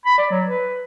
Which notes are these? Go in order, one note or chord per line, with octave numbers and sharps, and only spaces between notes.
B5
D5
F#3
B4